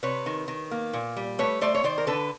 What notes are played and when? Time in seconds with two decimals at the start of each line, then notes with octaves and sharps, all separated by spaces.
0.03 C3 B4 C#5
0.26 D#3
0.48 D#3
0.71 A#3
0.93 A#2
1.17 G3
1.39 A3 B4 C#5
1.61 A3 C5 D5
1.74 C#5
1.84 D#3 C5 D5
1.98 A#4
2.07 D3 A4 B4